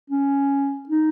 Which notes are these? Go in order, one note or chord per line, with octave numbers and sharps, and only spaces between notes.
C#4
D#4